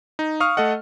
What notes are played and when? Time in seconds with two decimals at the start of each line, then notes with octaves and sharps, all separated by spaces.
0.19 D#4
0.40 F5 C#6 D#6 F6
0.57 A3 A4 D#5 F#5